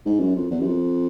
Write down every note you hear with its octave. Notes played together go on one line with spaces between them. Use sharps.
G#2
F#2
F2
E2
F#2
F2